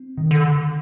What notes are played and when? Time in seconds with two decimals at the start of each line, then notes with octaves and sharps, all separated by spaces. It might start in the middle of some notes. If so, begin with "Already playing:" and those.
Already playing: C4
0.18 D#3
0.31 D3